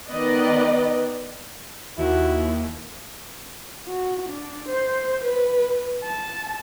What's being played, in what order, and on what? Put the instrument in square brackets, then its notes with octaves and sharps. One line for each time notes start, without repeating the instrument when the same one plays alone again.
[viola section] D#3 B3 B4 D5 D#5
[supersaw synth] D#2 [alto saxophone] E4 [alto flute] F#4
[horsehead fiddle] F#4
D4
C5
B4
A5